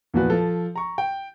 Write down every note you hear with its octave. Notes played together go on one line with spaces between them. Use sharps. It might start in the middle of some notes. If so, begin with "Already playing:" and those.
E2 A#2 F3 F#4 B4
F3 A4
A#5 C#6
G5